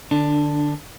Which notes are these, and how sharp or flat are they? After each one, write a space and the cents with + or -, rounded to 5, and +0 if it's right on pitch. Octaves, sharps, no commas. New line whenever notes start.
D3 +25 D4 +0